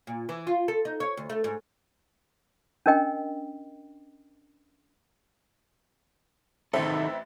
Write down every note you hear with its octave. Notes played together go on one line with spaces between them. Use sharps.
A#2
E3
F4
A4
D#4
C#5
D2
A3
G#2
C#4 D4 A#4 D#5 G5
A1 D#3 C4 D#4 A4 E5